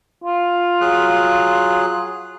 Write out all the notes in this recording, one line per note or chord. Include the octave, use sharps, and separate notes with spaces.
F4
F#3 G#4 F#6